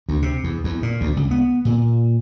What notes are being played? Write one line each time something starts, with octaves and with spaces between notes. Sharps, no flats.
D2
C3
E2
E2
A#2
D2
C#2
B3
A#2